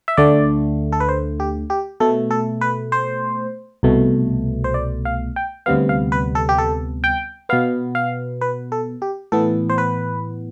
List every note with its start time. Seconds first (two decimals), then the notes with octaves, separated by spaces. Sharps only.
0.08 E5
0.17 D2 D3 A3 D5
0.92 A4
1.00 B4
1.09 C5
1.40 G4
1.70 G4
2.00 B2 A3 A4
2.31 A4
2.61 B4
2.92 C5
3.83 C2 B2 A3
4.64 C5
4.74 D5
5.05 F5
5.36 G5
5.66 D2 C3 G3 B3 F5
5.89 F5
6.12 B4
6.35 A4
6.49 G4
6.58 A4
7.04 G5
7.49 B2 B3 F5
7.95 F5
8.41 B4
8.72 A4
9.02 G4
9.32 A2 E3 B3 A4
9.69 C5
9.78 B4